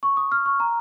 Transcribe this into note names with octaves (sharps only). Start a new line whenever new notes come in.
C#6
D#6
F6
C#6
A#5